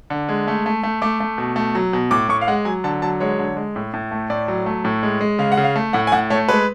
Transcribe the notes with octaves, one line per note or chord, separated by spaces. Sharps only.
D3
G#3
A3
A3
A3
A3 D6
A3
B2
A3
F#3
B2
A2 D6
A2 C#6
F5
G#3 F#5
F#3 G#5
D3 A5
F#3 A5
G#3 C#5
D3
G#3
A2
A2
A3
A2 D5
F#3
A3
A2
G#3
G#3
C#3 F5
F#5
C#3
F5
A3
A2 F#5
G#5
A2 F#5
A3 C#5
G#3 B4